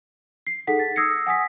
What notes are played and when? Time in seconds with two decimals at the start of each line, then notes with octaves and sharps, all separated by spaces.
0.47 C7
0.67 D#4 G#4 A4 F#5 B6
0.79 A6
0.96 D#6 E6 G#6 A#6 C7 C#7
1.26 F#5 G#5 D#6 B6